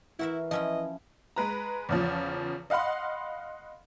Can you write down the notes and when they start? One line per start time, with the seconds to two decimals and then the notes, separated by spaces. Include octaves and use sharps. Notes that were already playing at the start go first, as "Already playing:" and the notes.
0.19 E3 E4 F#4 A#4 E5
0.51 F3 C#4 E4 D#5
1.36 G#3 B4 A#5
1.89 E2 C#3 F3
2.70 D#5 F5 F#5 B5 C6